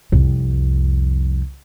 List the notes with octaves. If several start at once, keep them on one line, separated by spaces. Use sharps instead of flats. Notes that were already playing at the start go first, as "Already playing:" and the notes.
C2 F2